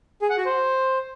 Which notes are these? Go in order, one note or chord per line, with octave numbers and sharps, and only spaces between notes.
G#4
F#5
F#4
C5